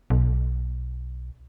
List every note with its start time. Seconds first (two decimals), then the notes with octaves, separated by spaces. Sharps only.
0.10 B1